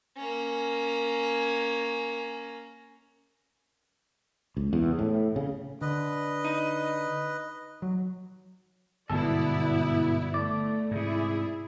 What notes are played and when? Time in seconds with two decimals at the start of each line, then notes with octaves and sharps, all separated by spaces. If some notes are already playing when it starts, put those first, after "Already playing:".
0.17 A#3 C#4
4.57 C#2
4.73 E2
4.99 A2
5.36 C#3
5.81 D3 B4 D#5
6.44 D#4
7.82 F#3
9.10 G1 G#2 B2 B3 E4 A4 D5
10.34 A3 D5
10.91 G#2 C3 E4 G#4